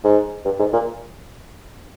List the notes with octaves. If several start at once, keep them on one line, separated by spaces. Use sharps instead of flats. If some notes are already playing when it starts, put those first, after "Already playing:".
G#2
G2
G#2
A#2